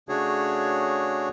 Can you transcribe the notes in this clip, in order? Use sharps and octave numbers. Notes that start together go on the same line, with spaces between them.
C#3 A3 D4 F#4 G#4 C#5